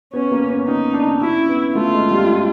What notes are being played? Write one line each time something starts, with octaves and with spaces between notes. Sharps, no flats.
B3 C#4
A#3
B3
C#4 D#4
D4
C#4 E4
B3
A3 F4
G#3
G3